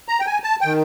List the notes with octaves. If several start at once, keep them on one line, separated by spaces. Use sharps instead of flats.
A#5
G5
G#5
A5
D#3 G5